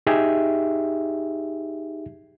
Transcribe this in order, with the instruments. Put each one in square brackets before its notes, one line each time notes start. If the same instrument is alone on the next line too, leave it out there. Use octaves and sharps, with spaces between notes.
[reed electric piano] D#4 G4 G#4 E5